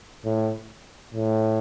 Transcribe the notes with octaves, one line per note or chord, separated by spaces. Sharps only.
A2
A2